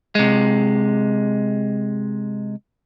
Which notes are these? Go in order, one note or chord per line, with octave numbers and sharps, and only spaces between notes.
C3 G#3